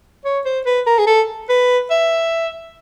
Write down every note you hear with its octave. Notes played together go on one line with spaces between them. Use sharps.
C#5
C5
B4
A#4
G#4
A4
B4
E5